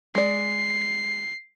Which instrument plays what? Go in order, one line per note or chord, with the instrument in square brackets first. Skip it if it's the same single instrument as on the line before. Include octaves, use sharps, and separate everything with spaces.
[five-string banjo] G#3 D5 [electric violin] C7